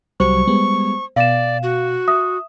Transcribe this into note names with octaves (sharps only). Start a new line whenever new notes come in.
C2 F#3 G3 C5 C#6
G3 G#3 B3
B2 D5 F5 E7
F#4
E5 D#6